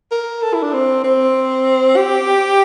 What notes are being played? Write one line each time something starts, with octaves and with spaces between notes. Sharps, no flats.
A#4
A4
E4
D4
C4
C4
G4